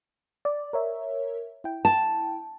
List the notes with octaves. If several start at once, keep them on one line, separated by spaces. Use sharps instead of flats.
D5
A#4 C#5 E5
E4 G5
A5